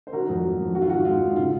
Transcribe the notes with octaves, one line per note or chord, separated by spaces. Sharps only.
C5
D#3 F#4 A#4
F2
F#3
F2
D#3 F#4
F4
G#2 F#4
G#3 F4
G#2
C#3 F4